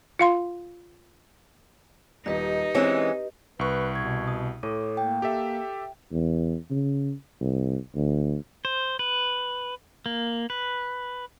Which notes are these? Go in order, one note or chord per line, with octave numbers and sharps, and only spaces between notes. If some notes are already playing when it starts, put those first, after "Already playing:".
F4 F5 C6
D#1 D#4 G4 B4 D#5
E3 G#3 C4 C#4
C2 B4 C#6
B2 G#6
D#6
A2 A4 C#5 D6
A#3 G5
G4 A4 E5
E2
C#3
C2
D2
C5
B4
A#3
B4